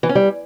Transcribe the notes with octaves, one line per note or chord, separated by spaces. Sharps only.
E3
C#4
G3